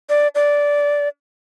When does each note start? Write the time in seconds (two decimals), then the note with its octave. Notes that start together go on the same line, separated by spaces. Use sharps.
0.09 D5
0.35 D5